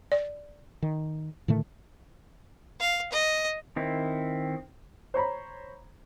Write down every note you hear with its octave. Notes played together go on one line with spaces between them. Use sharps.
D5
D#3
A2 D3 D#3 A3
F5
D#5
D#3 C4 E4
C5 C#5 A#5 B5